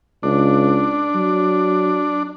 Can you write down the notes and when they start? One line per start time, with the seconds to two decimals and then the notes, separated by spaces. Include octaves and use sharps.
0.23 C#2 D4
1.15 F#3